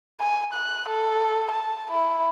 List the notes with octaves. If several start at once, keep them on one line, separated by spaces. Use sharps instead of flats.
G#5
F#6
A4
A5
E4